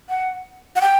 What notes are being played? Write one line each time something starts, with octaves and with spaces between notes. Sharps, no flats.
F#5
F#5
G5